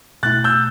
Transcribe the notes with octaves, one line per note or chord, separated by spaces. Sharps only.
B2 A3 E4 F#6 A6
E6 G6